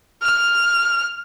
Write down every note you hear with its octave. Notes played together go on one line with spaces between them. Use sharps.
F6